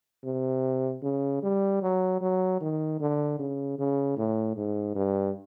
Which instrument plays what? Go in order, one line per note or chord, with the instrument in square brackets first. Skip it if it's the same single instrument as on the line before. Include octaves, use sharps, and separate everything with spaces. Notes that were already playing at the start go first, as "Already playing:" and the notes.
[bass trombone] C3
C#3
G3
F#3
F#3
D#3
D3
C#3
C#3
A2
G#2
G2